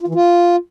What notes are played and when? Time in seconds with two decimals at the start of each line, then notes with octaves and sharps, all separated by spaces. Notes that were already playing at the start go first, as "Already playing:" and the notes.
0.01 F4
0.08 E3
0.15 F4